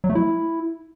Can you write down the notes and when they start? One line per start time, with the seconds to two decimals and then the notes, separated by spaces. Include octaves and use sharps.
0.04 F#3
0.10 A3
0.15 E4